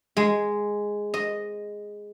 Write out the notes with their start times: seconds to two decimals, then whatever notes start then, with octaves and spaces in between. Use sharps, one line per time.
0.17 G#3
1.14 D#5